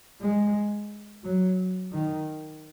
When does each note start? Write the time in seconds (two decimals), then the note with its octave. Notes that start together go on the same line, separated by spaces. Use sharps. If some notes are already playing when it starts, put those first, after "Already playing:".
0.21 G#3
1.24 F#3
1.92 D#3